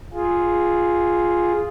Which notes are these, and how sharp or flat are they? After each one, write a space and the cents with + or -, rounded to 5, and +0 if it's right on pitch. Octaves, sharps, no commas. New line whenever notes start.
F4 +0 G#4 +0